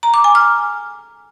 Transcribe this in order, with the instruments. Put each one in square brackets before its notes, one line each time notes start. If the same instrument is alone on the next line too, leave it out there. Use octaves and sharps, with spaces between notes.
[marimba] A#5
D6
G#5
F6